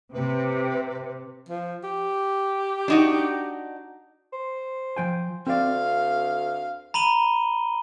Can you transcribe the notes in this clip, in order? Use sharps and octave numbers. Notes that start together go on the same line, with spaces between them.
C3 B4
F3
G4
D4 D#4 F#4
C5
F3 G5 G#5
D2 C4 D5 F5
A#5 B5 D#7 F#7 G7